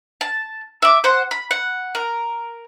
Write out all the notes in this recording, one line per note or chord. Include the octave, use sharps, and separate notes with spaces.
A5
E5 D6
C5 F#5
B5
F#5
A#4